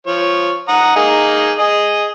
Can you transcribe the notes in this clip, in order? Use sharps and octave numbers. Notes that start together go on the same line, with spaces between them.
F3 C#5
F#5 A#5 D#6
A#3 D#4 G#4
G#4 D#5 D#6